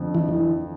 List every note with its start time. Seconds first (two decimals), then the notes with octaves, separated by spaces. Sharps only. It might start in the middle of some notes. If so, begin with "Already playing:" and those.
Already playing: F2 D3 F3
0.15 E3